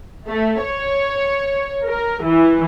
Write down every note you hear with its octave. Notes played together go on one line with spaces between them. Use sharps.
A3
C#5
A#4
E3